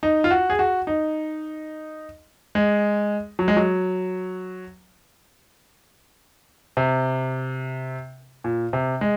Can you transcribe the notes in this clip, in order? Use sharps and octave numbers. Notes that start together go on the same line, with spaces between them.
D#4
F4
F#4
G#4
F#4
D#4
G#3
F#3
G#3
F#3
C3
A#2
C3
G#3